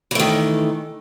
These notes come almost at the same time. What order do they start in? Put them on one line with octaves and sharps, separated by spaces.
E3 A3 D#3